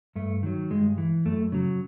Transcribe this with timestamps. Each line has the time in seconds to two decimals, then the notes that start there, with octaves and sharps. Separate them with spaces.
0.16 G2 A3
0.43 D#3 F#3
0.71 G2 G#3
0.98 E3
1.26 F#2 A3
1.52 C#3 F#3